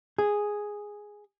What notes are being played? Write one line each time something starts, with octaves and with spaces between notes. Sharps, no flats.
G#4